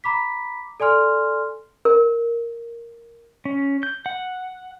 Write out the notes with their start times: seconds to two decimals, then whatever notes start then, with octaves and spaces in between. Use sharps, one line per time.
0.04 A#5 B5 D6 B6
0.80 A4 D5 G#5 C6 F6
1.85 A#4
3.45 C#4
3.83 G6
4.06 F#5